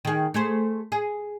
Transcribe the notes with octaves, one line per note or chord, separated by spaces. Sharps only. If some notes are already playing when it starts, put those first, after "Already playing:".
D#3 G#4
A3 G#4 C5
G#4